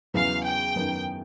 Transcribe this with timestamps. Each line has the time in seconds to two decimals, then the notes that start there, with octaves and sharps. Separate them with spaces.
0.14 E2 C#3 F#3 B3 E4 F5
0.45 G5
0.76 F#2 D#3 F#3 B3